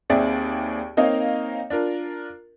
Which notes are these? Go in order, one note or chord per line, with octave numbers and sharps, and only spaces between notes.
D#2 C4 G#4 D5 E5
A#3 C4 D#4 C#5 D#5 F5
D4 F4 A#4